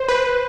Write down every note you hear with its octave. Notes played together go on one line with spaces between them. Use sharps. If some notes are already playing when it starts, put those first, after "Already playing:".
Already playing: C5
B4